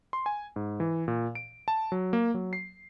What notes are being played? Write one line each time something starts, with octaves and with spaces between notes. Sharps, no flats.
C6
G#5
G#2
E3
A#2
D7
A5
F#3
A#3
F#3
C7